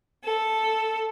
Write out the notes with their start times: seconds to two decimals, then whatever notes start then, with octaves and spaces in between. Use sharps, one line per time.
0.22 A4